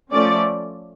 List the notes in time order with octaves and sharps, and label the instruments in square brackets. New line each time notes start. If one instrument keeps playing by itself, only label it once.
[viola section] F3 A3 C#4 D5